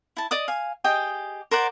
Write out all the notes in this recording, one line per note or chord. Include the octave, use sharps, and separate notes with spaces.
E4 A5
D5 D#5 D#6
F5 G#5
G4 G#4 D#5 G5
A#4 C5 D5 F#5